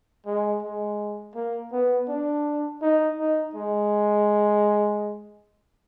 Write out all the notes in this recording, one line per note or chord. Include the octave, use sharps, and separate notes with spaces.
G#3
G#3
A#3
B3
D4
D#4
D#4
G#3